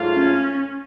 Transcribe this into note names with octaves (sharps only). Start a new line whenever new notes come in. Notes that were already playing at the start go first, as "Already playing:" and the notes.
Already playing: G#2 F#3 A3 F4
C#4